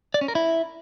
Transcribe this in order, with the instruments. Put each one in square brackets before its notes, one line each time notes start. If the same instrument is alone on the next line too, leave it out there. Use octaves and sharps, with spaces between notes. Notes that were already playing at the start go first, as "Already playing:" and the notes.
[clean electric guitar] D5
C#4
A#4
E4